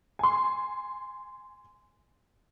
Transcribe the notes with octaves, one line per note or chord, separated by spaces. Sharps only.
G#5 C6